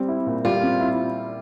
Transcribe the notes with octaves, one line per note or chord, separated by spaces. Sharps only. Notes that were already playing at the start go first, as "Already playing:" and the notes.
Already playing: G3 C4
E4
A#2
G3 F4
C4
E4